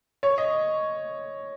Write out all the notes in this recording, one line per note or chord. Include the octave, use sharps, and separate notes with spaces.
C#5
D#5